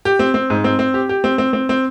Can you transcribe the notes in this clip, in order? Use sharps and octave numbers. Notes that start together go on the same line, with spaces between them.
G4
C4
C4
G#2
C4
C4
G4
G4
C4
C4
C4
C4